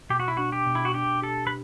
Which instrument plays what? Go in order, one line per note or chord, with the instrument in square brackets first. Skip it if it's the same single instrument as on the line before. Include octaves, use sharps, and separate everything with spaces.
[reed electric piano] B2 [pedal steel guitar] G4
[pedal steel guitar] F#4
E4
[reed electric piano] D4 [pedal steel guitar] F#4
[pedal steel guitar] G4
[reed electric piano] B2
[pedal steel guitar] E4
F#4
[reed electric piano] D4 [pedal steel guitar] G4
[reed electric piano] G4 [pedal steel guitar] A4
[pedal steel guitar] B4